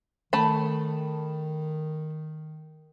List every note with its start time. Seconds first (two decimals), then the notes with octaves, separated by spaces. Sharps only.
0.33 D#3 A3 A5 B5